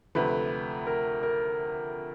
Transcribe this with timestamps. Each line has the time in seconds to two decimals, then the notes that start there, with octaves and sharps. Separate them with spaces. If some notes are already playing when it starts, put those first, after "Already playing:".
0.15 D2 C3 F3 A3 B4
0.87 A#4
1.23 A#4